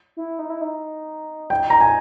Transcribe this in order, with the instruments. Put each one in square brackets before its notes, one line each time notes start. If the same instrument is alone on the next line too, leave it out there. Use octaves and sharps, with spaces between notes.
[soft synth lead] E4
D#4
E4
D#4
[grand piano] G5
A#5
G#5